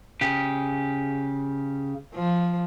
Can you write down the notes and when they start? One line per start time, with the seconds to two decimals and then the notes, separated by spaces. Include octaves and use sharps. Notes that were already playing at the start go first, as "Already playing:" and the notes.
0.21 C#3 G4
2.15 F3